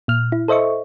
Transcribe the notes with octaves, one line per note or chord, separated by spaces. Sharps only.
A#2 F6
E4
A4 C5 D#5 E5 C#6